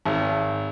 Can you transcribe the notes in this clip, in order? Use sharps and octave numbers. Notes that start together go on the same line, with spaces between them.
G#1